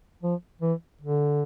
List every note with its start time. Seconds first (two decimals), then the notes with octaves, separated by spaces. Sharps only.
0.23 F3
0.61 E3
1.01 D3